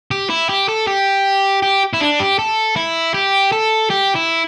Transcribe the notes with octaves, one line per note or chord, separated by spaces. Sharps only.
G4
E4
G4
A4
G4
G4
E4
D4
G4
A4
E4
G4
A4
G4
E4